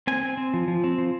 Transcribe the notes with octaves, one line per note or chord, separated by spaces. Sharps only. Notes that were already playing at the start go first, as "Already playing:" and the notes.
C4 G#5
C4
C4
F3
F3
C4
F3